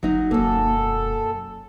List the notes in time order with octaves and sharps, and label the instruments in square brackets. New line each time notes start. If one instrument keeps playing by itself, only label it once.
[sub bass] G1 [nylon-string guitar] F#3 D#4
[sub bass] E1 [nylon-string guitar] F#2 A#3 [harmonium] A4